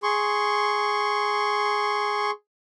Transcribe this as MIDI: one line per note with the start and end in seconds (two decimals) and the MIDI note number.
0.03 2.31 68
0.03 2.31 84
0.03 2.31 85